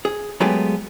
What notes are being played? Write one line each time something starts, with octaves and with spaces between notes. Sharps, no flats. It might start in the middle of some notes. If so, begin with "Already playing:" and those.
G#4
F#3 G#3 A3 B3 G4 G#4